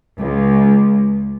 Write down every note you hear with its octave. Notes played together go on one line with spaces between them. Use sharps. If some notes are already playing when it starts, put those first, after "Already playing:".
C#2